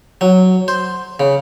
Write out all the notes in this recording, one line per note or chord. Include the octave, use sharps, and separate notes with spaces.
F#3
C5
C#3